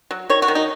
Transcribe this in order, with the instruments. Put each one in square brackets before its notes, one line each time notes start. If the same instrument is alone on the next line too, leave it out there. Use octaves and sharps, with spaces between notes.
[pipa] F#3
D#3 C#5
F#4
D#3
D#4